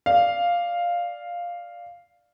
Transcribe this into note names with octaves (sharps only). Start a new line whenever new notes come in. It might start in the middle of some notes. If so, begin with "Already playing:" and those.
D5 F5